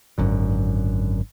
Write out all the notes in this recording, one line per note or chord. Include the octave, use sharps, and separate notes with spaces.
G#1 F#2 D3